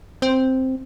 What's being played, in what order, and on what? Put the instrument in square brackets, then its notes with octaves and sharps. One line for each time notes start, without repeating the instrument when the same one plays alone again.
[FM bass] C4